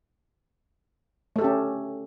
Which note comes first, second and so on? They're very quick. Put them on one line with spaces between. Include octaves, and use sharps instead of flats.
A3 A4 G4 C#4